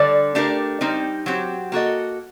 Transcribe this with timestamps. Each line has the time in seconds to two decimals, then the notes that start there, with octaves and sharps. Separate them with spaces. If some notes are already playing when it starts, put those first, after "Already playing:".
Already playing: D3 G3 D4 A4 D5
0.35 A3 D4 G4 A#4
0.81 G3 C4 D#4 G4
1.26 F#3 C4 G4
1.72 A#3 F#4 A4 D#5